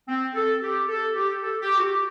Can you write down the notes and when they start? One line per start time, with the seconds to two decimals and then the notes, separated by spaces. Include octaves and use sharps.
0.08 C4
0.35 A4
0.62 G4
0.88 A4
1.16 G4
1.42 A4
1.62 G4
1.78 F#4
1.82 G4